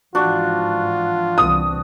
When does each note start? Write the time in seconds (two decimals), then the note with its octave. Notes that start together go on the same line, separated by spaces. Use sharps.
0.15 G#2 E3 F3 D4 F4 F#4
1.38 C2 E3 C4 D#6